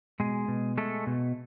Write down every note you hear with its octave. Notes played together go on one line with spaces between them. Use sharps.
B2 G#3 G#4
B2
G#3 A3 A4
B2